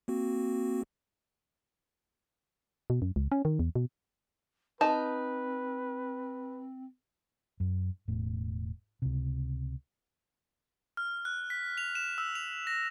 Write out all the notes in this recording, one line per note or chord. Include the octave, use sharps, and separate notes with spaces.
A#3 C4 F#4
B2
F#2
C#2
C#4
D#3
E2
B2
C4 D#4 B4 A5
F#2
E1 A2
C#2 C3
F6
F#6
B6
F7
E7
E6
F7
A#6